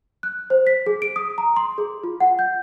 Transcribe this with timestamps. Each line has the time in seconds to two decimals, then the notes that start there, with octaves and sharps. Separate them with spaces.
0.23 F#6
0.50 C5
0.67 B6
0.86 G#4
1.02 D7
1.16 D#6
1.38 A#5
1.57 C6
1.78 G#4
2.03 F4
2.20 F#5
2.39 G6